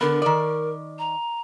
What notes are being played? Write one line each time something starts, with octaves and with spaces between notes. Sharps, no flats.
D3 B3 A#4
D#3 D5
A#5